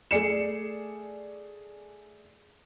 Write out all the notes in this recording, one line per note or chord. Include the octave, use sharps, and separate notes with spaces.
A3 G#4 D5 C7 C#7 E7